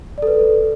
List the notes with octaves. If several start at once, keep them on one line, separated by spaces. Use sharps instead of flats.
A4 B4 D5